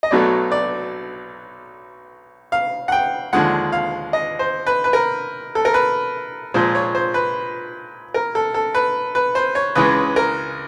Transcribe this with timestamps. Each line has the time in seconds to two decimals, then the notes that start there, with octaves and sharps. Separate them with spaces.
0.03 D#5
0.11 B1 B2 F#3 A3 D5
0.52 D5
2.52 F5
2.88 F#5
2.92 G5
3.33 D#2 D3 F3 G#3 F#5
3.72 F5
4.13 D#5
4.39 C5
4.67 B4
4.84 B4
4.93 A#4
5.55 A4
5.65 A#4
5.74 B4
6.54 A#2 F3 G#3 C5
6.75 C#5
6.95 C5
7.14 B4
8.14 A#4
8.35 A4
8.54 A4
8.75 B4
9.15 B4
9.35 C5
9.55 C#5
9.75 C#2 C#3 E3 G#3 B4
10.16 A#4